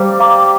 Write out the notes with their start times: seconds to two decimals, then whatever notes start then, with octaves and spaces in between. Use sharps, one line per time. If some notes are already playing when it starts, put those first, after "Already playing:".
Already playing: G3 C5 F5 A#5 D6
0.20 F5 A#5 D6